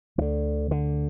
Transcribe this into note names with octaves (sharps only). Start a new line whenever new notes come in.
D2 D3 E3
D3